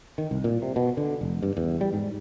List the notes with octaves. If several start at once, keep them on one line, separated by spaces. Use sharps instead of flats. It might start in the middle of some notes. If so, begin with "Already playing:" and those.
D#3
C2
A#2
C3
B2
D3
F1
G2
E2
G3
G#2